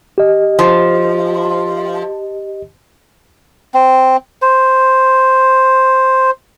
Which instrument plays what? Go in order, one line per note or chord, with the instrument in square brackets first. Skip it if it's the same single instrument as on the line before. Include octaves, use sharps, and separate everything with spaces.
[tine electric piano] G4 D#5
[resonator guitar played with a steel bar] F3
[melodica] C4
C5